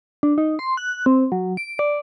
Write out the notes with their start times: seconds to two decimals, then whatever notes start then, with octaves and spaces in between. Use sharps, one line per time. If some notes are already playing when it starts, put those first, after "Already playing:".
0.23 D4
0.38 D#4
0.59 C6
0.77 F#6
1.06 C4
1.32 F#3
1.57 D7
1.79 D5